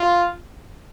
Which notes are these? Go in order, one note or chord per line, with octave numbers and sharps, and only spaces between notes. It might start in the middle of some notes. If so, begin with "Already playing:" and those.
Already playing: F4